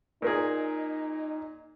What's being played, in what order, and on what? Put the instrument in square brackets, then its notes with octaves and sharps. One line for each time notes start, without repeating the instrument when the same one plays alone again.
[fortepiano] A#2 A#3 G#4 [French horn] D#4